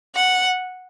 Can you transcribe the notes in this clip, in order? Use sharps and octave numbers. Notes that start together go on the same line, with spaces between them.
F#5